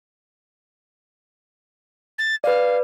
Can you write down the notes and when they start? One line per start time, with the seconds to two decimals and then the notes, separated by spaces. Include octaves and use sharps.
2.19 A6
2.44 B4 D5 F5